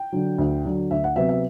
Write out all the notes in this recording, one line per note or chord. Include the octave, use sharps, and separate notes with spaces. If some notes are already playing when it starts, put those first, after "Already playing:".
Already playing: G5
D3 F#3
D2
D3 F#3
D2 E5
F#5
C3 F#3 B3 E5
E5